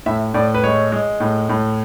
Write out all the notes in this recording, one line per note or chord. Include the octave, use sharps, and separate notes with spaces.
A2 E5
A2 D5
B4
G#3 C#5
G#3
A2
A2